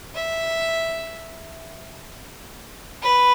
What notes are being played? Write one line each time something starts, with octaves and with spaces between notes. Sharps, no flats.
E5
B4